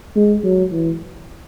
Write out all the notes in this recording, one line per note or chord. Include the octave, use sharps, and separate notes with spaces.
G#3
F#3
E3